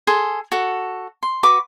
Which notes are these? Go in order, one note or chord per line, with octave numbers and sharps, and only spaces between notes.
G#4 A4 C6
F#4 A4
C6
F#4 B4 C#6 D6